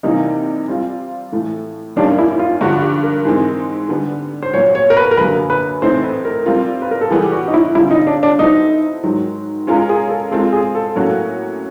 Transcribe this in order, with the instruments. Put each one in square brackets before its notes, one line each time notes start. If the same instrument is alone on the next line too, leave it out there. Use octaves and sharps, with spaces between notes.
[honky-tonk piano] C3 E3 G3 A#3 [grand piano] D#4
[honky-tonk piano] G3 C4 F4
A2 E3 A3
[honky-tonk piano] F#2 D#3 G3 A#3 C#4 [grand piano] D4
[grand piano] E4
F4
[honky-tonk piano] G2 D3 F3 [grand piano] F#4
[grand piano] G4
A#4
[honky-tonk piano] G#2 E3 G#3 C4 D#4
D3 G3 B3
[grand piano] C5
[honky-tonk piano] A#2 F#3 B3 [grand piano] C#5
[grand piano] C#5
A#4
B4
A#4
[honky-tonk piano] F#2 D3 F#3 A#3 [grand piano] B4
[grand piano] B4
[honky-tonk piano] A2 E3 A3 C4 D#4 [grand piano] C5
[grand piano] B4
A#4
[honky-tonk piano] G3 C4 F4
[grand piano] B4
A#4
A4
[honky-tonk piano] E3 G3 B3 [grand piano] G#4
[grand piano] G4
F#4
D#4
E4
[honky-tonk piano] D3 G3 C4 F4 [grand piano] E4
[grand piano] D#4
D4
D4
[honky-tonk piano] F#3 B3 E4 A4 C5 [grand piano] D#4
[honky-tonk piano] G#2 D#3 F#3
G#3 C#4 F4 A#4
[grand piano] G#4
A4
[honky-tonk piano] G#3 C4 F4 [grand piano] A4
[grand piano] G#4
A4
[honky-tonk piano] A2 F#3 A#3 C#4 F#4